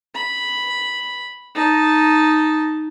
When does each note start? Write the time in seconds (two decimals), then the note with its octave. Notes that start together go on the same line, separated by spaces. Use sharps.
0.15 B5
1.55 D#4 A5